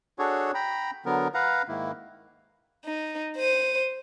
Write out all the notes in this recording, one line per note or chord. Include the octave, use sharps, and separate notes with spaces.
D4 F#4 G#4 A4 C#5
G5 A#5 B5
D3 F#3 B3 A#4
B4 F5 F#5 A#5
G#2 D#3 A#3 E4
D#4
C5 D#7